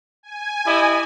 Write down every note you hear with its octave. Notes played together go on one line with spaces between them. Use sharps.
G#5
E4 G4 D#5